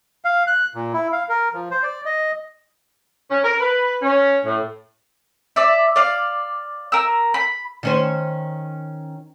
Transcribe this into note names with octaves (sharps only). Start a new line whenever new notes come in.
F5
F#6
A#2
E4
F5
A#4
F3
C5
D5
D#5
C#4
A#4
B4
C#4
A2
D5 E5
D5 F5
A#4 E6
B5
D#3 C#4 C5